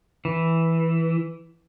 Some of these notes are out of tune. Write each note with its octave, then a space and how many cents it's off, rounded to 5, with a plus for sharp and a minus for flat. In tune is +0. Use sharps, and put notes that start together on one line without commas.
E3 -5